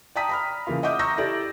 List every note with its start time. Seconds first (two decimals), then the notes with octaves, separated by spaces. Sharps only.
0.15 D5 G5 A5 A#5 D#6 B6
0.29 A#5 B5 F6
0.67 C#3 E3 A#3 F4
0.83 D#5 E5 F#5 D6 D#6 G6
0.99 A#5 C#6 E6 G6 A#6
1.18 E4 G4 A4 D5